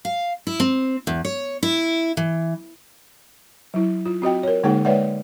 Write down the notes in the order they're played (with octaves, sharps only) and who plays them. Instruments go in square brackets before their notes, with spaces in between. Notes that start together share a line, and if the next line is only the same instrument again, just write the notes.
[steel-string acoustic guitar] F5
E4
C4
E2
C#5
E4
E3
[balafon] F#3 E4
F4
C4 F#4 D#5 G5
A#4 C#5
D3 G#3 A#3 D#4 G#4 F#5
G#3 B4 C#5 D5 E5 F#5